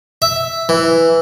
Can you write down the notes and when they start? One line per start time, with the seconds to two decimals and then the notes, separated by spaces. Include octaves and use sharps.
0.22 E5
0.69 E3